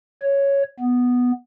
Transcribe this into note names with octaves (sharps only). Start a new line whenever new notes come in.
C#5
B3